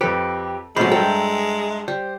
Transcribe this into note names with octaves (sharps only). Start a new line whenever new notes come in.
F2 C4 G4 A4 B4
A1 B2 F#3 G#3 A3 C5 B5
G2 A4 E5 G5 A#5
G3 C5